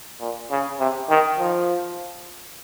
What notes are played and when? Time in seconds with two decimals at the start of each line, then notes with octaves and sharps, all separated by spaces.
0.21 A#2
0.50 C#3
0.79 C3
1.09 D#3
1.39 F3